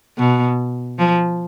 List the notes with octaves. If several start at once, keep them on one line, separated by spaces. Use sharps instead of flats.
B2
F3